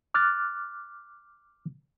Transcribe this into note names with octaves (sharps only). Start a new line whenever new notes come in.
D6 F6 F#6 A6